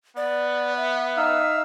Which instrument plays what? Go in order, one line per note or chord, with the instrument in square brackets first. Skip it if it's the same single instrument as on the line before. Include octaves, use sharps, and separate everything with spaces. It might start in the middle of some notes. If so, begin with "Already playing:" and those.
[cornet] B3 [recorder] D5
[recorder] E5
[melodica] D#4 F5 E6